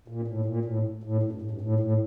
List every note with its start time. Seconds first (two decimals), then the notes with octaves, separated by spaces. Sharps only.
0.08 A#2
0.28 A2
0.46 A#2
0.65 A2
1.03 A2
1.23 A2
1.32 G2
1.42 A2
1.51 G2
1.61 A2
1.80 A2